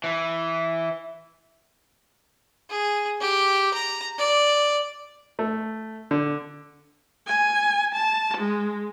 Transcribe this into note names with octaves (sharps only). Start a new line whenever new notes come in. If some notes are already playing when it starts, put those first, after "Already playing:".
E3
G#4
G4
A#5
D5
A3
D3
G#5
A5
G#3